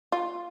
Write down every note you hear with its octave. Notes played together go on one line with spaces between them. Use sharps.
F4